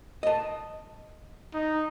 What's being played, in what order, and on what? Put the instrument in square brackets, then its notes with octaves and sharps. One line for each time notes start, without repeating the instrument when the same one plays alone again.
[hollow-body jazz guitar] D#5 A5
[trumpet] D#4